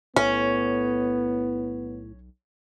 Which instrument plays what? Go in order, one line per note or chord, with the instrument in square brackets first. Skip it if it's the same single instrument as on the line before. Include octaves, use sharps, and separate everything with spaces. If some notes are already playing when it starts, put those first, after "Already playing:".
[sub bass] B1 [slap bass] A2 [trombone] B3 [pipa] C#4